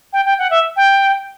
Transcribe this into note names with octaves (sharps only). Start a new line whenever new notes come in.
G5
G5
F#5
E5
G5